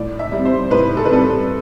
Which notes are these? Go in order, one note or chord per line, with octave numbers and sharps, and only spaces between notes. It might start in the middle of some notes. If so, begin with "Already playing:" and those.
Already playing: A2 D5
E5
G3 C4
C5
A2 B4
A4
B4
G3 C4 A4